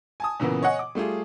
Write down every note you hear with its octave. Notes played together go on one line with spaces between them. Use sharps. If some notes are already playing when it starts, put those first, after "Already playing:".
G#5 A5 D#6
A#2 C#3 E3 A#3 B3
C#5 D#5 F#5 G#5
D6
G3 A3 F4 G#4